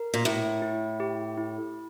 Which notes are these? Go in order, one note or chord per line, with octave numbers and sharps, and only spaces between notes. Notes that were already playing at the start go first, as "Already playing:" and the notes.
Already playing: A#4
A#2
A2 E4
E4
G4
E4